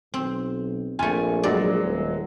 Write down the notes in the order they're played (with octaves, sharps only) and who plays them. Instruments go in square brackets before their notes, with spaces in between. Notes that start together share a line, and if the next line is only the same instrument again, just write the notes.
[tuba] B1 [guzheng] C4
[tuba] A#1 [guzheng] A3 F4 [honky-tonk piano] G#5
[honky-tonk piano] F#3 G#3 [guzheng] D5
[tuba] D#1